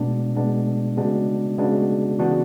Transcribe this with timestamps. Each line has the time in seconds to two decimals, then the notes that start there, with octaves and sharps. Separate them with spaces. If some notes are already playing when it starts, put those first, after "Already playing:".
Already playing: B2 G#3 B3 D4
0.36 B2 G#3 B3 D4
0.97 C#3 G#3 B3 D4 F#4
1.58 C#3 G#3 B3 D4 F#4
2.19 C#3 E3 B3 D4 F#4